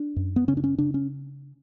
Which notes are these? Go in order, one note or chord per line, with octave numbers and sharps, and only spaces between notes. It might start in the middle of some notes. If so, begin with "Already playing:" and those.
Already playing: D4
F#2
B3
C#3 C#4
D4
C#4
C#3 D4
C#4